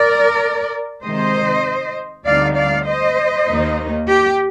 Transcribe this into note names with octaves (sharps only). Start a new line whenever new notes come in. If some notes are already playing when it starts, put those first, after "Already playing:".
Already playing: A#4 D5
C3 D#3 G#3 C5 D#5
D2 D3 G3 C4 D#4 D5 F5
D5 F5
C5 D#5
D#2 D#3 A#3 D#4
G4